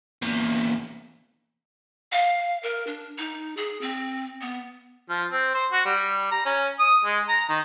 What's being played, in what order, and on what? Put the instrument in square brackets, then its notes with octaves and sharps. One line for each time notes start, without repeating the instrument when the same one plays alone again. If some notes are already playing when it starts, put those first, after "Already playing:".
[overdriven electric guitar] E2 A#2
[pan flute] F5
A#4
D4
D#4
G#4
C4
B3
[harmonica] F3
C4
C5
F#4
G3
A#5
C#4
D#6
G#3
A#5
D#3